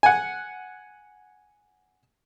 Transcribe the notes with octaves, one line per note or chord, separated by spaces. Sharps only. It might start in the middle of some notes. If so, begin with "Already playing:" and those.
F#5 G#5